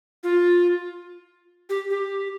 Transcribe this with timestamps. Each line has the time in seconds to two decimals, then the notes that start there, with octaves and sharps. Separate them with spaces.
0.23 F4
1.69 G4
1.90 G4